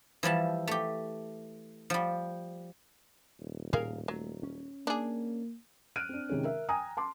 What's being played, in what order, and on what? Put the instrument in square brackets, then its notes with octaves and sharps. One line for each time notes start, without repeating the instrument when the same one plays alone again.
[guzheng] E3 F3 G3 A5
A3 G4
F3 G3
[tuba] D#1
[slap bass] A2 [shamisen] G#4 A#4 F5
[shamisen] F#3 [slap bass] A3
[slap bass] C#4
[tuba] A#3 [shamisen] D4 G#4
[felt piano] F6 F#6 D7 D#7
C4 D4
C3 D#3 G#3 C#4
A#4 E5
G5 G#5 A#5 D#6
A5 C6 D6